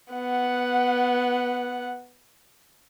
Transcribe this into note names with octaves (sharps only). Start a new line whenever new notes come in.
B3 F#5